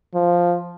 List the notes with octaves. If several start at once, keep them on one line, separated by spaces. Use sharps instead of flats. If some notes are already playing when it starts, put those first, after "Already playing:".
F3